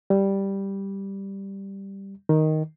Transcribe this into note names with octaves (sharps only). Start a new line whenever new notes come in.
G3
D#3